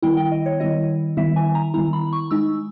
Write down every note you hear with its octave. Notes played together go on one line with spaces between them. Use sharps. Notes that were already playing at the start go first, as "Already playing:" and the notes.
D#3 G3 B3 E4 G5
G5
D#5
C#5
D#3 G3 B3 E4 D#5
D#3 G3 B3 E4 E5
G#5
A#5
D#3 G3 B3 E4 A#5
B5
C#6
G#3 D#4 E6